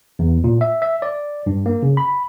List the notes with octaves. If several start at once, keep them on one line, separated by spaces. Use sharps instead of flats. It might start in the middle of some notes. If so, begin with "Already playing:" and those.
E2
A#2
E5
E5
D5
G2
A#3
C#3
B5